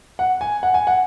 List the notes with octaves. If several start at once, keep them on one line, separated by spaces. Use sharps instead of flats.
F#5
G#5
F#5
G#5
F#5